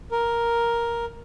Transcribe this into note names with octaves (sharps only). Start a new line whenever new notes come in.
A#4